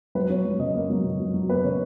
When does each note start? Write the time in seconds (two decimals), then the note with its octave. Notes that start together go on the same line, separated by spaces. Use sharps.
0.15 F#3 B4
0.30 F#3 C#5
0.45 F#3
0.60 C#3 D#5
0.74 A#3
0.90 F#3
1.04 C#3
1.20 F#3
1.34 F#3
1.49 A#3 B4
1.64 C#3 C#5